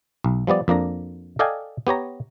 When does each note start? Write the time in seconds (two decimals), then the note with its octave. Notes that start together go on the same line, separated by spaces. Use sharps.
0.24 B1
0.47 F3 G3 B3 D5
0.68 F2 A#3 D4 A#5
1.39 A4 D5 D#5 F5 G5 G#5
1.87 B3 G4 C#5 A#5